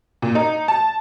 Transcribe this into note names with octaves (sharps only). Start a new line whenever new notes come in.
A#2
D#4
A5